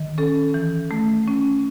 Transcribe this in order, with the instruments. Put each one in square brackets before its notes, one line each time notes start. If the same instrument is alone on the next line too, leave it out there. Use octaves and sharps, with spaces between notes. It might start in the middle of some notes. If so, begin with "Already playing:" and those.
Already playing: [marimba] D#3
C#4 A4
E3
A3
C#4